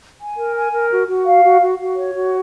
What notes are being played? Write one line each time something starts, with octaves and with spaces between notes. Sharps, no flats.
G#5
A#4
G#5
A#4
F#4
F#4
F5
F#4
F#4
F#4
C#5
F#4